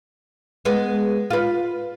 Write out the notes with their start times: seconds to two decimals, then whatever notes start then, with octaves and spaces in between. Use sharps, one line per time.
0.65 G#3 B3
1.30 F4 B4